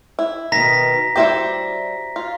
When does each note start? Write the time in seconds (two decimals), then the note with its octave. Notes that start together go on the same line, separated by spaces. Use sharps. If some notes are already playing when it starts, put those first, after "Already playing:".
0.19 E4
0.52 B2 D#3 A#5 A#6 B6
1.16 G3 E4 F#4 G4 C5 E5
2.16 F4